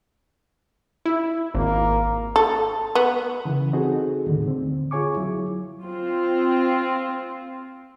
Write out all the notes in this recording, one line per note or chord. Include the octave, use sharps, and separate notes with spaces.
E4
G#1 A#3
A4
B3
C#3 E3
C4 D#4 F#4 G#4 A4
D#2 A2 D3
D3 C4
F4 G#4 C#5 G#5 C#6 D6
F#3 E4
C4 F4